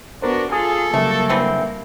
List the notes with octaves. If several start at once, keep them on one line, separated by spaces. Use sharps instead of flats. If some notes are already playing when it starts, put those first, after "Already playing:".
B3 D4 F#4 A#4 C5
F4 G#4 A4 G#5 D#6
C#3 F#3 G3 A3 A#3
D3 E3 C4